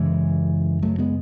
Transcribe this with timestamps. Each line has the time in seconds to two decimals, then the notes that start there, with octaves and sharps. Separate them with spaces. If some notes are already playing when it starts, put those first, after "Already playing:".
Already playing: F#2 C#3 E3 G#3
0.82 F#3 A3
0.98 G#3 B3